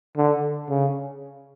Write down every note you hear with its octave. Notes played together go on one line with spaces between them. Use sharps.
D3
C#3